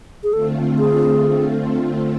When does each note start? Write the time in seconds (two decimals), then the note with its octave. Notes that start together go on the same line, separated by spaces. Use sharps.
0.24 G#4
0.33 D3 A3 C4 F4 A4
0.79 G#4